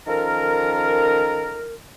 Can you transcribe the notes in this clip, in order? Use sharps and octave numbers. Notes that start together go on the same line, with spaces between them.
D#3 F3 C#4 A4 A#4